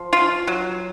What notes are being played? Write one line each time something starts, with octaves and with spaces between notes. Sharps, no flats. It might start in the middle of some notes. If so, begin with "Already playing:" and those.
Already playing: F3
F4
F#3